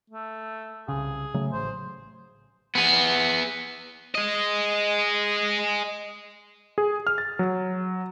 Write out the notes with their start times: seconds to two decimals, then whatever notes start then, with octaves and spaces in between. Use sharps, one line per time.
0.10 A3
0.88 C2 C#3 G#4
1.34 C#3 F#3 A3
1.53 A1 C5
2.75 B3 G#4
4.15 G#4 D#5
6.78 G#4
7.07 F6
7.18 A6
7.39 F#3